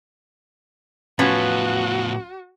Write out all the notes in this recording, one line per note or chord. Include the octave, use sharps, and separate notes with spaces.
A2 F3 B3 C#4 F#4 B4